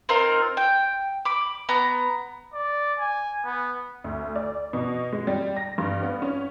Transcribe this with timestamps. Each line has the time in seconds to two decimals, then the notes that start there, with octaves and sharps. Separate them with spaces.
0.09 C4 D#4 F4 A#4
0.57 G5
1.25 B5 D6
1.69 B3 A#5
2.54 D5
2.99 G#5
3.45 B3
4.04 D2
4.36 D5
4.73 B2
5.13 G#3
5.27 G3
5.56 A#6
5.78 G2
6.03 B3
6.22 C#4